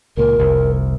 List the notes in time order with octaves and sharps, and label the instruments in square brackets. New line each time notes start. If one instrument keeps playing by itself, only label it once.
[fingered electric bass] C#2 A#2 [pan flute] A#4
[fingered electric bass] F1 C2